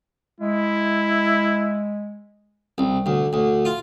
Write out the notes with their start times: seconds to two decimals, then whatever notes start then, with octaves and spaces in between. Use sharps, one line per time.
0.40 G#3 E4
2.78 C2
3.06 D2
3.33 D2
3.65 F4